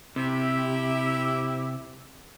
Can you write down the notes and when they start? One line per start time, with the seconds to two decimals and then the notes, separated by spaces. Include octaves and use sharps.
0.16 C3 E4 G4